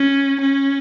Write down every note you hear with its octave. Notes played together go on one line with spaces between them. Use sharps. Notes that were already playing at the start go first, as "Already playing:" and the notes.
Already playing: C#4
C#4